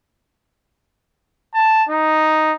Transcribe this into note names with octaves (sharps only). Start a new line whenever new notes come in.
A5
D#4